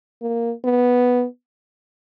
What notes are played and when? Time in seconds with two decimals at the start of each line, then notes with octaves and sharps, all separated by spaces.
0.22 A#3
0.65 B3